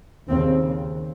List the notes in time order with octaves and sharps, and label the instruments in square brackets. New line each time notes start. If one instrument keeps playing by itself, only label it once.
[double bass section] D#2 C#3 C4